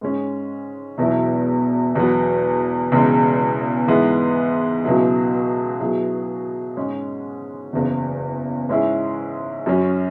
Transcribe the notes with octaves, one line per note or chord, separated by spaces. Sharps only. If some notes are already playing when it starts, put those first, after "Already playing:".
G#2 G#3 C#4
E1 E2 B2 F#3 E4
E1 E2 B2 F#3 B3
E1 E2 C#3 G#3
G#2 E3 B3 G#4
C#2 B2 F#3 E4 G#4
B2 F#3 E4 G#4
G#2 G#3 C#4
F#1 E2 C#3
G#2 G#3 C#4 E4 G#4
F#2 F#3 C#4